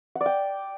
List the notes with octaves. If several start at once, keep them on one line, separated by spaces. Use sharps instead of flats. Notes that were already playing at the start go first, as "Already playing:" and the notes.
F#5
D5
G5